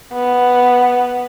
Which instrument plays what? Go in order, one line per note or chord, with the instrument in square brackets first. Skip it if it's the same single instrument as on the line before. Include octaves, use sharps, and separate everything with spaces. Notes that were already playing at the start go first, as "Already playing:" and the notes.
[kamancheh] B3